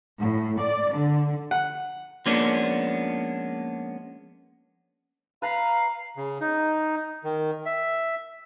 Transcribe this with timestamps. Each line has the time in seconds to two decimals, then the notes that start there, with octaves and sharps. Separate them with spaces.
0.19 A2
0.59 D5
0.92 D3
1.51 F#5
2.26 F3 G#3 A#3 B3 C#4 D4
5.42 B4 F5 A#5 B5
6.17 C#3
6.41 D#4
7.24 D#3
7.66 E5